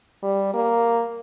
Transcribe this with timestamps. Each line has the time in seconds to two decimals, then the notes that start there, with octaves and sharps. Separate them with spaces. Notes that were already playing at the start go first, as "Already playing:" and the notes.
0.23 G3
0.54 A#3